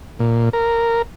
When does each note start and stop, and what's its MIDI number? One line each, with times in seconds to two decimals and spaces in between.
0.19 0.49 46
0.53 1.02 70